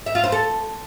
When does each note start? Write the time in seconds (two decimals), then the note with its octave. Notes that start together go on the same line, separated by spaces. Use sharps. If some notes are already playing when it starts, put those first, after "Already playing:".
0.06 E5
0.15 F4
0.24 C5
0.32 A4